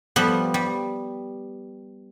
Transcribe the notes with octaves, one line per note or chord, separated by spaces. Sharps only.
F3 G3 B3
G3